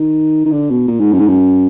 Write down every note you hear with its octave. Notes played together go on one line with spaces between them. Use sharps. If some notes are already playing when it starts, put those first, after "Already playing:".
Already playing: D#3
D#3
D3
B2
A#2
G#2
F#2
G#2
F#2